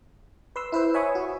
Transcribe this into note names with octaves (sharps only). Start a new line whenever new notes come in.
B4 C6 E6
E4 B4 C5 E6
C#5 E5 G#5 B5 C#6 D#6
F#4